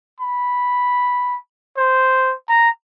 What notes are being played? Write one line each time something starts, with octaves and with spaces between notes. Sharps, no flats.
B5
C5
A#5